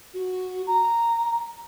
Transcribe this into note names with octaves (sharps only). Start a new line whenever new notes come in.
F#4
A#5